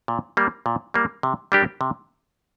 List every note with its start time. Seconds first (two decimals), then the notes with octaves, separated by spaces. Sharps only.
0.08 A#2
0.37 G3 A#3
0.66 A#2
0.94 G3 A#3
1.23 C3
1.52 G3 D4 G4 A#4
1.81 C3